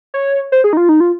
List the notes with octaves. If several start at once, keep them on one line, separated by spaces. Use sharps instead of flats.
C#5
C5
G#4
D#4
F4
D#4
F4